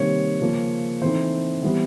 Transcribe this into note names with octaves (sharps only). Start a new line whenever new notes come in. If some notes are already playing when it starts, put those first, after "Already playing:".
Already playing: C3 D#3 G3 A#3 C#4 C#5
C#3 F3 A#3
E3 A3 C4 D#4 C5
E3 G3 B3